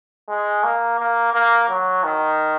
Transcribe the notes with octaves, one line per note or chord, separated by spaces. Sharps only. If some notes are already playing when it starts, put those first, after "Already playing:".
G#3
A#3
A#3
A#3
F#3
D#3